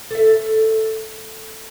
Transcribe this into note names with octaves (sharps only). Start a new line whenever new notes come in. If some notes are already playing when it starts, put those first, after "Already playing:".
A4 E5